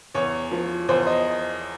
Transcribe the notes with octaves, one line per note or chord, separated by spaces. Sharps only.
E2 C#5
F3
E2 C5
D#5